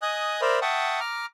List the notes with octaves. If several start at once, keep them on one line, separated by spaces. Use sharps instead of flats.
D#5 G#5 D#6 F#6
A#4 C5 D5 E5 A#5 B5
E5 F#5 G5 A5 C#6 D#6
A#5 D6 F6